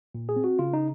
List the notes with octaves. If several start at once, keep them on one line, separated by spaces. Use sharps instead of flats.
A#2
G#4
C4
F#4
C#3 F4
D#4